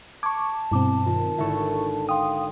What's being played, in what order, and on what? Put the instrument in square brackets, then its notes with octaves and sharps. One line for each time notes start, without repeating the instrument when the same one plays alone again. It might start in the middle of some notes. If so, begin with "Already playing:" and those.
[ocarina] A5 [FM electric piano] C#6 D6 [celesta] G#6
[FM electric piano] G2 B2 C4 [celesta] E4 D6
[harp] D#3 [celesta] F4
[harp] G#1 D3 A4 [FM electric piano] E4 C#6
[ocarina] F5 [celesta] G5 C6 [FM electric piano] D#6